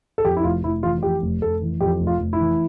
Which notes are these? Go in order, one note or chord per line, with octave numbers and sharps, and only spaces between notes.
A4
F2 G4
E4
F1 F4
F1 E4
E3 F4
F4
F2 G4
F1
F1 A4
E3
F2 G4
F1
F4
F1
E4
E3